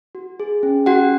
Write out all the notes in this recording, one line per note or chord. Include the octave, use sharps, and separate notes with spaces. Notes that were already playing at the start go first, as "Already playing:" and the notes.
F#4
G#4
C#4
C#4 F#4 F#5